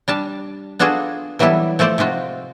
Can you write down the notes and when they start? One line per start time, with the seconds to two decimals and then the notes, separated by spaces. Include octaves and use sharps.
0.08 G3 D4 A5
0.79 B3 D4 F4 F#4 G#4 A4
1.39 E3 F#3 G3 B3 E4 A4
1.79 F3 A3 A4 C5 D5
1.98 C3 G#3 F4 F#4